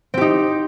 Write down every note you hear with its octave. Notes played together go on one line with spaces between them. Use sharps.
C4 D#4 G4